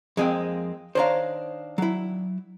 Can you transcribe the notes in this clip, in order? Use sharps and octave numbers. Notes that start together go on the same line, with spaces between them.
F2 G#3 A#3 C4 G#4 G5
D#3 D4 C5 C#5 F5 A#5
F#3 E4